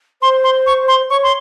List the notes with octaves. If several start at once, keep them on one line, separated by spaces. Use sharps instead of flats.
C5 C6
C6
C#6
C6
C#5 C#6
C6